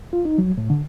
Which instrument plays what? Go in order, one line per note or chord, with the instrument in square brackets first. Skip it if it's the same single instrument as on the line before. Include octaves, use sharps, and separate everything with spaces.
[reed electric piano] F4
D#4
F#3
A2
D3